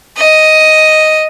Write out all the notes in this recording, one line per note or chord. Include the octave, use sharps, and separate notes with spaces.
D#5